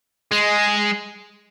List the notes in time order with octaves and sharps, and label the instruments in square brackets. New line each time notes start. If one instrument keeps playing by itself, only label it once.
[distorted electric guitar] G#3